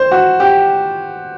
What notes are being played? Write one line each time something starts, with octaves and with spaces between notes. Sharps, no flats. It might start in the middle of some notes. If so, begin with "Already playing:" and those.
Already playing: C5
F#4
G4